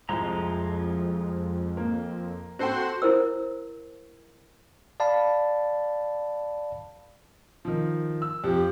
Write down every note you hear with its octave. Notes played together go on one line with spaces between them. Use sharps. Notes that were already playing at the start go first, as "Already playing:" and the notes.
C2 F2 F3 G#3 A#5
A#3
C4 F#4 A4 C5 G5 C6
E4 A#4 C5 E6
D5 F5 A5 B5
D#3 F3
E6
F2 G4